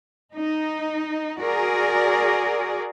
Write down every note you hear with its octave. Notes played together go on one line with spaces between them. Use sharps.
D#4
F#4 G#4 A#4 D5